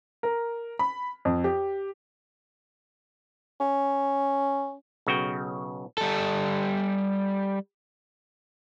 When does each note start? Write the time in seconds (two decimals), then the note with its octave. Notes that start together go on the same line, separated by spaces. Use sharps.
0.23 A#4
0.79 B5
1.25 F2
1.44 G4
3.61 C#4
5.07 B1 C#3 F#4 G5
5.98 G3 A4